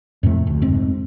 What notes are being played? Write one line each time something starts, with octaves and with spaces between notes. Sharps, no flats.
F2 A2 C3 A3
D2
F1 G#2 C4